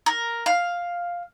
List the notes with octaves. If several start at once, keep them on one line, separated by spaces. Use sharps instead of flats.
A#4
F5